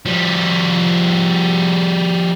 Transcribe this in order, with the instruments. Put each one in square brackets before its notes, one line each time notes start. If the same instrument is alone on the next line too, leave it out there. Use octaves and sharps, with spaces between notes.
[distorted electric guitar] F3 G3